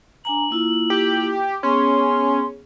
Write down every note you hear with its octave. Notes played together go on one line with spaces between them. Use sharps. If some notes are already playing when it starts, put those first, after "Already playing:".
D4 G#5 A#5 F#7
A#3 E4 F4
G4
B3 C#4 G#4 C6